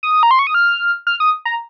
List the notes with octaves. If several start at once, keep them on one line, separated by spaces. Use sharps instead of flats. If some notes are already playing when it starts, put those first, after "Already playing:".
D#6
A#5
C6
C#6
D#6
F6
F6
D#6
A#5